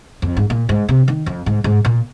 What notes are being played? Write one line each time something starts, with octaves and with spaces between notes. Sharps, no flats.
F2
G#2
A#2
G#2
C3
D#3
F2
G#2
G#2
A#2